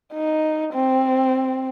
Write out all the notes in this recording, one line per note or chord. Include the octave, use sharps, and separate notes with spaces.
D#4
C4